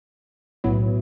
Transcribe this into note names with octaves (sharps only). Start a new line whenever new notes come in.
B1 A2 F#3 B3 E4